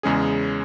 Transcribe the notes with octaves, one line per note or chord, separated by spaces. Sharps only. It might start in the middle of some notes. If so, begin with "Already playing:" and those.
E2 C#3 G#3 C#4 G#4